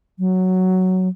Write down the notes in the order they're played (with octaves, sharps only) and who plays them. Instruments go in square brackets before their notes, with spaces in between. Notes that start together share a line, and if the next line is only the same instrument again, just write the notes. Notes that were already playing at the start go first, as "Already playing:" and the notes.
[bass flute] F#3